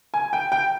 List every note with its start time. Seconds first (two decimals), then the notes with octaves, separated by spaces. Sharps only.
0.14 G#5
0.33 G5
0.52 G5